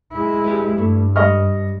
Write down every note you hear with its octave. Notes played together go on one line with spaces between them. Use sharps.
G#3 E4
G4 B4
G2 A3
G3 D#5 C#6 F6